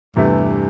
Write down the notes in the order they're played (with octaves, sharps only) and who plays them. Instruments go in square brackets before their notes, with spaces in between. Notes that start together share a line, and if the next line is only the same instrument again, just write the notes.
[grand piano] E2 C3 E3 A3 [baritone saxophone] G2